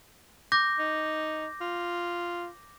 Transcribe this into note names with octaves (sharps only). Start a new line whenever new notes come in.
D6 G6 A#6
D#4
F4